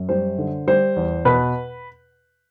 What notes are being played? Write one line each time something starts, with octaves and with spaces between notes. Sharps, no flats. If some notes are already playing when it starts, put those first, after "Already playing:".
Already playing: F#2
G3 C5
D3
G3 C5
E2
B2 B4